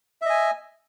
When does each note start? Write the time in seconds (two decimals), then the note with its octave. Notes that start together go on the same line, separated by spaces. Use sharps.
0.22 E5
0.26 D#5
0.30 G#5